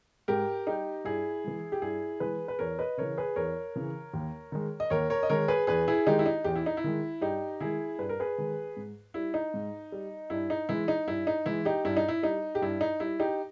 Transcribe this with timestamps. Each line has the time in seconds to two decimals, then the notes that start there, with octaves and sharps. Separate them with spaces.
0.28 G#2 G4 A#4
0.66 G3 D#4 G4
1.05 G2 E4 G#4
1.44 E3 G#3
1.72 G4
1.82 G2 E4 G#4
2.20 E3 G#3 G#4 B4
2.48 B4
2.59 E2 A#4 C#5
2.79 B4 D#5
2.97 C#3 E3 A#4 C#5
3.18 G#4 B4
3.36 E2 A#4 C#5
3.76 C#3 E3
4.14 D#2
4.52 D#3 G#3
4.80 D#5
4.90 D#2 A#4 C#5
5.10 A#4 C#5
5.23 D#5
5.29 D#3 G#3 A#4 C#5
5.48 G#4 B4
5.67 E2 G#4 B4
5.88 E4 G#4
6.07 D#3 G#3 D#4 G4
6.19 E4
6.26 D#4
6.44 E2 G4
6.56 E4
6.66 D#4
6.77 E4
6.84 D#3 G#3
7.21 G2 D#4 G4
7.60 D#3 G#3 E4 G#4
7.99 G2 B4
8.09 A#4
8.20 G#4 B4
8.38 D#3 G#3
8.77 G#2
9.14 G3 E4
9.34 D#4
9.54 G#2
9.92 G3
10.30 G2 E4
10.50 D#4
10.69 E3 G#3 E4
10.88 D#4
11.08 G2 E4
11.27 D#4
11.46 E3 G#3 E4
11.65 D#4 G4
11.85 G2 E4
11.97 D#4
12.08 E4
12.23 G3 D#4
12.55 G4
12.62 G2 E4
12.81 D#4
13.00 G3 E4
13.20 D#4 G4